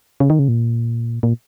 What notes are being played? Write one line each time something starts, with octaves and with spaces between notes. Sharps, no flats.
C#3
D#3
C#3
A#2
A#2